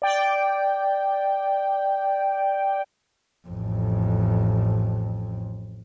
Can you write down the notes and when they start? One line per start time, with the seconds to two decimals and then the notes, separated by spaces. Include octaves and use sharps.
0.02 D5 G5
3.48 A1 F2